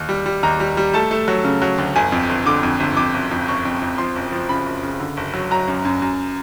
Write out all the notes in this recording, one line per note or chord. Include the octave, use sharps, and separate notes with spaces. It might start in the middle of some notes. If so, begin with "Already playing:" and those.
Already playing: D#2
G3
G3
D#2 A#5
G3
G3
A3 A5
A3
F#3
C#3
F#3
D2
G1 G#5
F2
G1
D3 D6
F2
G1
F2 D6
F#1
F2
F#1 C#6
F2
F2
F3 C6
F#1
F3
C#3 B5
F#1
C#3
D3
F#1
F#3
F#3 A#5
F#2
F#2
F#2